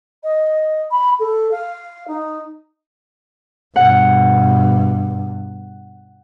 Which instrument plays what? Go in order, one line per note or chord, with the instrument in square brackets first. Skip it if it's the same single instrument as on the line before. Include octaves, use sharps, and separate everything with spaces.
[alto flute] D#5
B5
A4
F5
D#4
[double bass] G2 B2 [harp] F#5